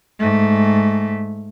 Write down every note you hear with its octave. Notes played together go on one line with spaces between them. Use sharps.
G#2 A3